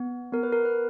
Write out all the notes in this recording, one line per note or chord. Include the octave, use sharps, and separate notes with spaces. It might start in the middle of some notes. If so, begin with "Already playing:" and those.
Already playing: B3
B3 A#4
B4
A#4
B4